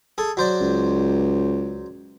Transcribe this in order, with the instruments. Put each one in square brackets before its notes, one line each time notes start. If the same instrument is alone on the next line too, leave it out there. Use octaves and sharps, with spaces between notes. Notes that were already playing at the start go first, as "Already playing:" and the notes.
[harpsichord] G#4 A4
F#3 C5 D5
[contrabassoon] C#2